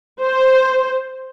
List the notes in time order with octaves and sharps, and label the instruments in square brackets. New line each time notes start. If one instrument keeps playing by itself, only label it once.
[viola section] C5